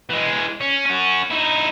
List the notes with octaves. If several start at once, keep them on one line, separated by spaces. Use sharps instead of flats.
E3 G#3
C#4
C#4 F#4
D#4 E4